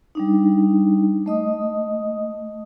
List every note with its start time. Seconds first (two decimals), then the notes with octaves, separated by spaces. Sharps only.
0.15 G3 D4 D#4
1.26 A3 D#5 D#6